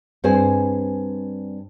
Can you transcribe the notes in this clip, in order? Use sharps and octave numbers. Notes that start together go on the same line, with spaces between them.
G2 C4 G#4 C5 G#5